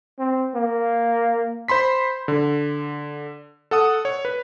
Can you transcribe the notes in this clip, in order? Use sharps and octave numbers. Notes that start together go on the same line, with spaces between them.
C4
A#3
C5 B5 C6 B6
D3
A4 F#5 D#6
C#5
B4